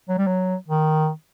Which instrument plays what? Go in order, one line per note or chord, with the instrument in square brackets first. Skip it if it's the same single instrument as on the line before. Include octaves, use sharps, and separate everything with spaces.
[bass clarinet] F#3
G3
F#3
D#3